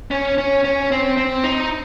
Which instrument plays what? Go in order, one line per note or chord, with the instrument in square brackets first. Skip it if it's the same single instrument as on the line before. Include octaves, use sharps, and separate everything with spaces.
[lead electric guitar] C#4
C#4
C#4
C4
C4
D#4